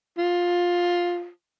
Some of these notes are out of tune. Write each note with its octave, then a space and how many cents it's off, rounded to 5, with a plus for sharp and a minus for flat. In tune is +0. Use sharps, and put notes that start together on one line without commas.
F4 +10